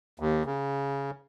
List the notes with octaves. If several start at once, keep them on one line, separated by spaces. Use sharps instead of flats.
D#2
C#3